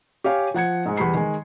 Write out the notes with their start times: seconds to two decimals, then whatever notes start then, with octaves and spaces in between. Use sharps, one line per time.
0.24 G4 C#5 F5 G#5
0.54 F3 F#5 G#6 C#7
0.86 G#2 G#3
0.97 E2 G3 B5 C7
1.14 D#3 G#3